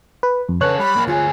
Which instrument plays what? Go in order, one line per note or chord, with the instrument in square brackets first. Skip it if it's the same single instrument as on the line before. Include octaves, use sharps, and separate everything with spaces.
[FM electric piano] B4
F2
[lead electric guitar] C#3 A4 [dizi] B4 [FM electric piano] C#5 F#6
[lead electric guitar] G3 [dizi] B5
[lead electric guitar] A#3 D4
[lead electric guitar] D2 G#4 [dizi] F4